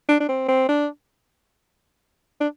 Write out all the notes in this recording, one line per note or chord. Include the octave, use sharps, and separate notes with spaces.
D4
D4
C4
C4
D4
D4